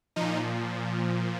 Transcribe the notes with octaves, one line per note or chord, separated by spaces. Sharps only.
A#2 F3 D#4